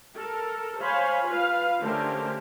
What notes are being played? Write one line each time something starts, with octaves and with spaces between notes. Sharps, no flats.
A4 A#4
C5 C#5 F5 G#5 B5
F4 B4 F5
D3 A3 C#4 G4 A#4 C5